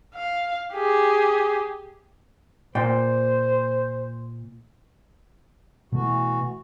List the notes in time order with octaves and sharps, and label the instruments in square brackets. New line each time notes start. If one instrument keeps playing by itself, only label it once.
[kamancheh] F5
G4 G#4
[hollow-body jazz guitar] A#2 D5 G5 [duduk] C5
[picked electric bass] B2 A3 [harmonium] E3 F#4